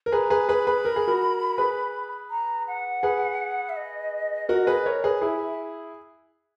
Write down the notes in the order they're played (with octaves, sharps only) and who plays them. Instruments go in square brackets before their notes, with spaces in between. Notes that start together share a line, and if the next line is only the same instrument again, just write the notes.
[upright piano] A#4
[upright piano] G#4 B4 [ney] A#5
[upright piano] G#4 B4
[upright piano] G#4 B4 [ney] B5
[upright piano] G#4 B4
A#4
G#4
F#4 A#4
G#4 B4
[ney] A#5
F#5
[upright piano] G#4 B4
[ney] E5
D#5
[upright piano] F#4 A#4
G#4 B4
A#4 C#5
G#4 B4
[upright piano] E4 G#4 [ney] E5